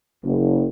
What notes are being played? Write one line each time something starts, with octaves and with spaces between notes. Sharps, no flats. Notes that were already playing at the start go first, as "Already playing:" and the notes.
F#1